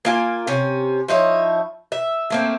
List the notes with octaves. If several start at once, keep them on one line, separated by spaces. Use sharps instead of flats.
A#3 F4 G#5
C3 C#4
F3 D#4 E4 C#5
E5
A3 A#3 C4